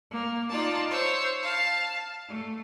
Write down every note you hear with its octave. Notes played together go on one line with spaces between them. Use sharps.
A#3
D#4 F4 D5 A5
C5 C#5 E6
F5 A5
A3